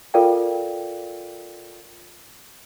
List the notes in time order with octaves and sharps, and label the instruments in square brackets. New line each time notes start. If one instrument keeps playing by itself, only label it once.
[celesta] F4 A4 A#4 D5 F5 G5